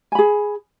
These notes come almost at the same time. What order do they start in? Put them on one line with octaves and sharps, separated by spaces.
G#5 B5 G#4